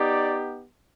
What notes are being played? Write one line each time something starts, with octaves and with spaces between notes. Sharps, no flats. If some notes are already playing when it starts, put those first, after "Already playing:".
Already playing: B3 D#4 G4 D5